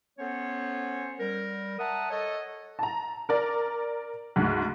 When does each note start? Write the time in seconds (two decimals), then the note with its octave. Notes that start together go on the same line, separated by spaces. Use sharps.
0.19 B3 C#4 A4 C5 C#5
1.20 G3 A#4
1.79 E5 F#5 A5 A#5 D#6
2.11 A4 C#5 D#5
2.79 A5 A#5
3.29 A#4 D5 A#5
4.36 D2 G#2